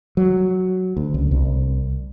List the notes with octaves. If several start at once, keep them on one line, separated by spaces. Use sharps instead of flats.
F#3
D2
C#2
C2